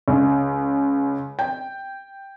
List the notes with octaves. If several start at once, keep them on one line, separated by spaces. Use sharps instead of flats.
C#2
G5